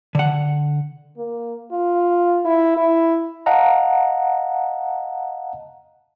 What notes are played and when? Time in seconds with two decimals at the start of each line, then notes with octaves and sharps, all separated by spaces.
0.15 D3 F#5
1.17 A#3
1.71 F4
2.45 E4
2.77 E4
3.46 D#5 F5 F#5 A5 A#5